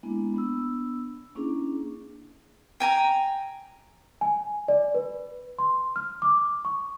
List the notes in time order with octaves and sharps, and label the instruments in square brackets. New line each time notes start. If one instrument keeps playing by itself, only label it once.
[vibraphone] G#3 A#3 B3 D4 E4
B3 D4 E6
A#3 C#4 D4 E4 G#4
[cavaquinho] G5 G#5 A#5
[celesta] G#5
D5
B4
C6
F6
D6
C#6